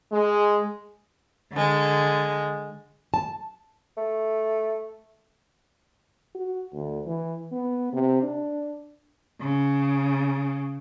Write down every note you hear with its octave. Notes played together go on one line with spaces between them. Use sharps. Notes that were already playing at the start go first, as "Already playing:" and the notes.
G#3
D3 G#3
A5
A3
F#4
D2
E3
B3
C3
D4
C#3